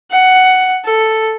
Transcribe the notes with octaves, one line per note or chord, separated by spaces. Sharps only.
F#5
A4